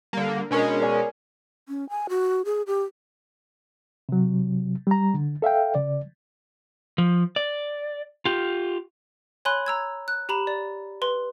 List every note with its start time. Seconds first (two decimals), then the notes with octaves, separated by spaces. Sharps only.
0.13 D3 G3 A#3
0.51 B2 G#3 C#4 D4 A#4
0.81 A#4 D5 G#5
1.68 C#4
1.89 G#5
2.09 F#4
2.45 G#4
2.67 G4
4.09 C3 F#3
4.87 G3 A#5
5.14 D3
5.42 A4 E5 F5 G5
5.75 C#3 D5
6.98 F3
7.36 D5
8.25 F4 G4
9.45 C#5 G#5 B5 C6 F#6
9.66 A#5 E6 G#6
10.08 F#6
10.29 G4 A#5 B5 E7
10.47 D5
11.02 B4 C6